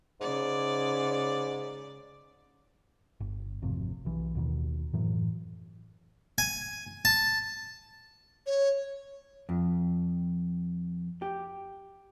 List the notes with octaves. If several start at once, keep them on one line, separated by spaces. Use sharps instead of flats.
G#2 C#3 D5
G1
G#1 F2 C3
B1 E3
D#2 B2 D#3
F#2 A2 E3 F#3
G#5
A5
C#5
F2
G4